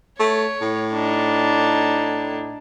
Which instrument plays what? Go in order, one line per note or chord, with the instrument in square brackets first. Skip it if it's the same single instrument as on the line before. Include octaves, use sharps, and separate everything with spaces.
[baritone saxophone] A3 [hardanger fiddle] C#5
[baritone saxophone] A2
[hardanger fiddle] D4 D#4